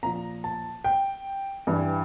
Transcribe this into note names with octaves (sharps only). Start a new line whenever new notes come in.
A#2 F3 A#5
A5
G5
G2 E3